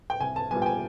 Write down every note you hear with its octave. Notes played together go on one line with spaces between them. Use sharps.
G5
C2 G#5
A5
A#2 G3 B3 G#5
G5
G#5